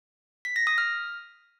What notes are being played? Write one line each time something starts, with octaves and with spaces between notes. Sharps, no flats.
B6
A#6
D#6
F6